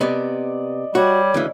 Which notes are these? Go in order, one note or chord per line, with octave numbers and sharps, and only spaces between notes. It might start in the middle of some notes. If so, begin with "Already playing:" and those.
C3 B3 D5 D#5
G3 F#4 C#5
D2 C#3 E3